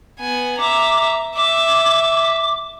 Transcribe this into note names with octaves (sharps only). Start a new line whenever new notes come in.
B3 G#5
E5 A#5 D6
E5 D6